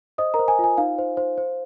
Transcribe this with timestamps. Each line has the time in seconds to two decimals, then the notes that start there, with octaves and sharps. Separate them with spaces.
0.18 C5 D#5 D#6
0.34 A#4 A#5
0.39 C5
0.48 G#5
0.59 F4
0.64 G#5
0.78 D#4 F5
0.99 C5
1.17 C5
1.38 C5